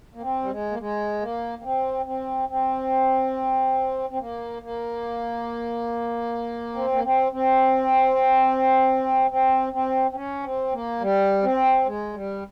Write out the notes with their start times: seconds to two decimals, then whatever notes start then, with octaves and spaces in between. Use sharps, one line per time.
0.15 A#3
0.22 C4
0.43 G3
0.50 G#3
0.71 A#3
0.79 G#3
1.21 A#3
1.59 A#3
1.63 C4
2.06 C4
2.49 C4
4.10 C4
4.19 A#3
4.62 A#3
6.75 C4
6.92 A#3
7.04 C4
7.32 C4
9.30 C4
9.73 C4
10.11 C4
10.15 C#4
10.44 C4
10.73 A#3
11.00 G3
11.43 C4
11.86 G#3
12.14 G3